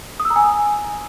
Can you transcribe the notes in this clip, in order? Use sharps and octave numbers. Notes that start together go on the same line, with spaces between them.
D#6
E6
A#5
G#5